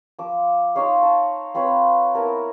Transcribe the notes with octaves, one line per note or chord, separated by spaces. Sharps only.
F3 D6
D#4 C5 C#5 F5
A5
C4 F4 B4 C#5
B3 E4 A#4 A5